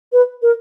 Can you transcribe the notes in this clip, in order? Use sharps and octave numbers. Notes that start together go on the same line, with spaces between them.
B4
A#4